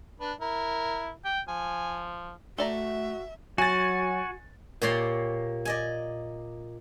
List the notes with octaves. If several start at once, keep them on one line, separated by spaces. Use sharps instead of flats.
D4 B4
E4 A#4
G5
F3 G#5
A3 F#4 A4 D5 E5 A#5
F#3 F#4 G#5 A6
A#2 A#3 G4 C#5 D5 C6
D5 D#5 G#5